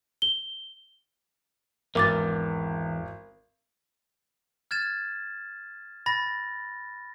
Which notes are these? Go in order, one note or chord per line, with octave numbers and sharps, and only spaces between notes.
G7
G#1 E2 A#4 D6 A6
F6 G#6 A6 E7
B5 A6 A#6